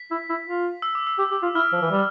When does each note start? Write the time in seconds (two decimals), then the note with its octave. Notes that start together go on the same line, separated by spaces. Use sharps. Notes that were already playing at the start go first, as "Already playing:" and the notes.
Already playing: B6
0.11 E4
0.29 E4
0.46 F4
0.82 E6
0.95 D6
1.07 E6
1.18 G4
1.31 G4
1.43 F4
1.55 E4 F6
1.72 F3
1.82 E3
1.91 G3